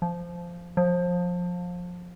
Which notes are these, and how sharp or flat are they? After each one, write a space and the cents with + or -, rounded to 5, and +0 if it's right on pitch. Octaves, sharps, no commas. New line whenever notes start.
F3 -10
F3 +25